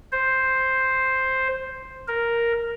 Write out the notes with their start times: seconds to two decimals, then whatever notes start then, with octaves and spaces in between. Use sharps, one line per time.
0.12 C5
2.08 A#4